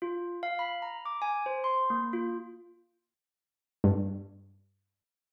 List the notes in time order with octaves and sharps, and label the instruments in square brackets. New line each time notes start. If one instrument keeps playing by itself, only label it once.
[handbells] F4
F5
B5
A#5
D6
G#5
C5
C6
A#3
F4
[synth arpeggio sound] G2